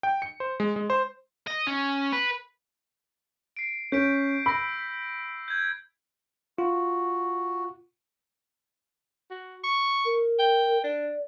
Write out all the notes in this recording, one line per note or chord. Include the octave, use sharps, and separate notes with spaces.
G5
C#7
C5
G#3
G#3
C5
D#5
C#4
B4
C7 D7
C#4 G6 B6 D7
B5 E6 A#6
G6 G#6
F4 F#4
F#4
C#6
A#4
G5
D4 D5